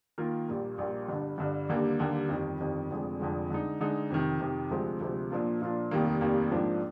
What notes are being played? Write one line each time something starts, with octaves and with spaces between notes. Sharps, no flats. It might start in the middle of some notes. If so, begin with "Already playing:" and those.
D#3 A#3 F4 A#4
A#1 A#2 G3 A#3
A#1 A#2 G3 A#3
G1 G2 D3
G1 G2 D3
D#2 D3 G3 A#3
D#2 D3 G3 A#3
G1 F2 D#3 G3
G1 F2 D#3 G3
F1 F2 D3 F3 G#3
F1 F2 D3 F3 G#3
D3 G#3 D#4
D3 G#3 D#4
F2 C3 D#3
F2 C3 D#3
D2 C3 F3 G#3 C4
D2 C3 F3 G#3 C4
A#2 F3 A#3 D4 F4
A#2 F3 A#3 D4 F4
F1 D#2 D#3 G3 A#3
F1 D#2 D#3 G3 A#3
A#1 G#2 F3 A#3 D4